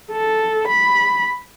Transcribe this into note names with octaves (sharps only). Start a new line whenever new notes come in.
A4
B5